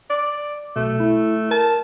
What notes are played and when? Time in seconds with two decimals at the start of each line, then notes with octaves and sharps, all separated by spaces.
0.10 D5
0.76 B1 B2 A3
1.00 E4
1.51 A#4 A5